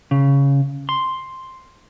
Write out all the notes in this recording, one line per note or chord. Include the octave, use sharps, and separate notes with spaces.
C#3
C6